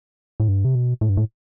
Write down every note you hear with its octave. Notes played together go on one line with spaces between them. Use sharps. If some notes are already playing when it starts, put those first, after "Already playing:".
A2
G2
C3
B2
A2
G2
A2